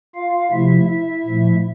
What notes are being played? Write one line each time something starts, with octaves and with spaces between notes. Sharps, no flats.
F4 F5
C3 F3 A3 E4 E5
E4 E5
A#2 F3 A3